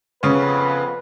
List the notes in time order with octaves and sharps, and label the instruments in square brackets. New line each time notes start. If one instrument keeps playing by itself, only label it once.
[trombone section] F2 B3 B4 [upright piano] C#3 C#4